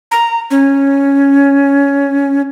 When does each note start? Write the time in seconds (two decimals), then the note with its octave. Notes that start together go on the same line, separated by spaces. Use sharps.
0.11 A#5
0.51 C#4